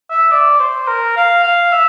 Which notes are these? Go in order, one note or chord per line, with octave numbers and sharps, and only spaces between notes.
E5
D5
C5
A#4
F5
F5
E5